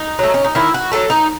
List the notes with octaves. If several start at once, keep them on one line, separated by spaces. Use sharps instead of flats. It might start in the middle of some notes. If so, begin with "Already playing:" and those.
Already playing: D#4
F#3 A3
C#4
D#4
D#3 E4
F#4
F#3 A3 A4
D#4